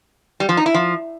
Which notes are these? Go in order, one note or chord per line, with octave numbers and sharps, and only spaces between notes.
G3
F3
D#4
E4
F3